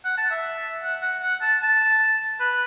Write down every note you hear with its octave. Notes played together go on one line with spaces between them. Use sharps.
F#5
A5
E5
F#5
F#5
F#5
A5
A5
B4